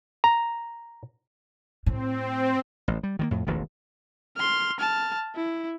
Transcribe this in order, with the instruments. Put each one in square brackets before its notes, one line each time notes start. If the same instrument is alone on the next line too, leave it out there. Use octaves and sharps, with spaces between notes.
[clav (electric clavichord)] A#5
[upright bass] A2 [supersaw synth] C4
[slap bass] A1
G3
D#3 F#3 A#3
F2 A2
E1 A1 D#2 D#3
[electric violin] C6 F6
A5 F6
E4